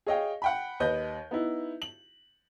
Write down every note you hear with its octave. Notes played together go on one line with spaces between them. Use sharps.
G#4 C#5 D#5 F5 G5
F#5 G5 B5
D#2 B4 D#5 G6
B3 D#4 E4
F#7